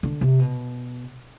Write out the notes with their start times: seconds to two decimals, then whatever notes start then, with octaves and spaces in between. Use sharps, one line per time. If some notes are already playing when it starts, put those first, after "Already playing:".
0.03 D3
0.21 C3
0.39 B2